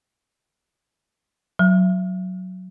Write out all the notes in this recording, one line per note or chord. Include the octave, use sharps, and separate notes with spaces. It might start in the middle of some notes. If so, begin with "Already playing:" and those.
F#3